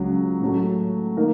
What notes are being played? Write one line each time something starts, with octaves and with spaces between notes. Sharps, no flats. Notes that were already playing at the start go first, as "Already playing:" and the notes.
Already playing: C#2 C#3 F#3
A2 F#3 A3
D#3 A#3 D#4 A#4